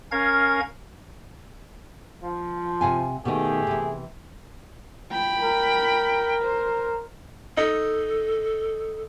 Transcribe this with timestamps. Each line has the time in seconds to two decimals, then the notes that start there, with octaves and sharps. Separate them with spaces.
0.12 C#4 A#4 F5 G#6
2.21 F3
2.81 C3 F5 G#5
3.25 B2 D#3 A3 G4 G#4
3.67 C3 E3
5.11 G5 B5
5.41 A#4
6.43 C5
7.57 D#4 A4